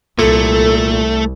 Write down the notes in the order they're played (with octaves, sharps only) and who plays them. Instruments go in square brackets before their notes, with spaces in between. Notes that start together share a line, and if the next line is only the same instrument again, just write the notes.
[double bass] C2 [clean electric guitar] A#2 [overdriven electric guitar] A3 [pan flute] A4